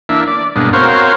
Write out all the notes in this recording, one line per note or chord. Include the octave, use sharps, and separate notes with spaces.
E3 A#3 D4 E5
D5
G2 B2 G#3 A#3 B3 D4
C4 F#4 A#4 C5 C#5 F5